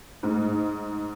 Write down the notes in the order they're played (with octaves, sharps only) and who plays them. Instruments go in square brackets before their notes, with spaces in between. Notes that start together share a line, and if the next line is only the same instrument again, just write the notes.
[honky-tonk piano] G#2 [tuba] A3